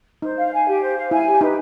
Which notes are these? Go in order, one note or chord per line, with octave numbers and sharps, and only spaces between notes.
D#4 C5
F5
G#5
G4
C5
F5
E4 G#5
G4
D#4 B4